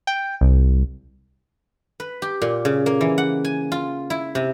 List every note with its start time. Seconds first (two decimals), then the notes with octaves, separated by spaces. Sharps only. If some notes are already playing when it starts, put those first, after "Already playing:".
0.07 G5
0.41 C2
2.00 B4
2.22 G4
2.42 A#2
2.65 C#3
2.86 A#3
3.01 E3
3.18 F#5
3.45 G#5
3.72 F4
4.10 E4
4.35 C3